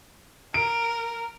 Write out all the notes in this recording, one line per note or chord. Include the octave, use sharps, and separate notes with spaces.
A#4 D7